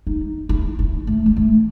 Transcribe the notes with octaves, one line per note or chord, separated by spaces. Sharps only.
D#4
E4
E4
A3
G#3
A3